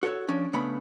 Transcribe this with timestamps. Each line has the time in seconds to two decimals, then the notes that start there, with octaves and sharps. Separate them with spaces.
0.03 F#4 A4 A#4 C#5 E5
0.28 F3 C#4 D4
0.53 C#3 A3 B3 D4 B5